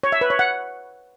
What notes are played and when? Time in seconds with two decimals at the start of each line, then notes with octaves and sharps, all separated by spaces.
0.03 C#5
0.12 E5
0.21 B4
0.30 C#5
0.39 F#5